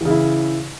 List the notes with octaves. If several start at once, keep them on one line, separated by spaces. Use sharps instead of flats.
C#3 E3 E4